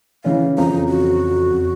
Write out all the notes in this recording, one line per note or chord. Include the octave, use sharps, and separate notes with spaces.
C#3 E3 C#4 F5
F2 A#5
F#4